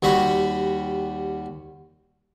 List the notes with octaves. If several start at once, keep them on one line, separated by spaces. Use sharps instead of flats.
D#2 G3 F#4 B5 C6